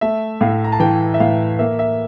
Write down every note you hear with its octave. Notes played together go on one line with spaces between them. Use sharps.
A3 E5
A2 F5
A#5
A5
E3 G5
E5
A2 F5
A#3 E5
E5